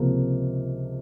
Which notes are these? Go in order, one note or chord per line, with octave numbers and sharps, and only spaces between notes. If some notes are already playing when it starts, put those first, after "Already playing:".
Already playing: C#2 C3 F3 A#3